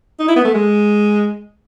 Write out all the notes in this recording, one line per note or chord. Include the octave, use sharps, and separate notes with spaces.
D#4
E4
B3
A3
G#3